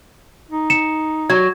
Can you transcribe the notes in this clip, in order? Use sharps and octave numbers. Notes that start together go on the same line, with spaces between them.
D#4
C#7 E7
F#3 G#6